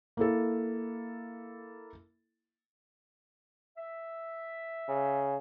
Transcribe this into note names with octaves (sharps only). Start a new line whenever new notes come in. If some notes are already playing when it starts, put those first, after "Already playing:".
A#3 E4 A4
E5
C#3